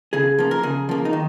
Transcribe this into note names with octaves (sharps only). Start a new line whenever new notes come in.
C#3 G#4
F3 A#3
A#4
C#3 G#4
F3 A#3
D#4
D#3